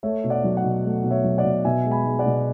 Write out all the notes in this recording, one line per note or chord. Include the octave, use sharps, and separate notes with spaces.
A3 C#5 E5
B2
D5 F#5
F#3
D5 F#5
B2
A3
B2
C#5 E5
F#3
D5 F#5
B2
B2 E5 G#5
G#3
G#5 B5
G#3
D5 F#5
B2